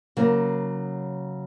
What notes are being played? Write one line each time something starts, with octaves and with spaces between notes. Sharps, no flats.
C#3 F#3 A#3